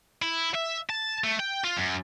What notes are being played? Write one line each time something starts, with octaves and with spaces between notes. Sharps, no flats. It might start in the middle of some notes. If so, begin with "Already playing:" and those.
E4
E5
A5
A3
G5
F4
F#2